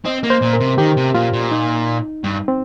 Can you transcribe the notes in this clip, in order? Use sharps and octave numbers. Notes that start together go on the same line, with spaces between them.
C4 D#5
A#3
C5
A#2
A#4
C3
D#3 G4
C3
A#2 F4
A#2
D#4
G2
C4